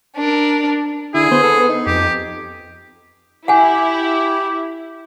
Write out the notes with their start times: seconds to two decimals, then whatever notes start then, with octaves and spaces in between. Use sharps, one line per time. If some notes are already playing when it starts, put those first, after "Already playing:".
0.17 D4 A#4
1.14 D3 E4 G#4
1.31 B3 C5
1.43 A4
1.69 D#4
1.86 F2 G4
3.48 E4 G4 F#5 G#5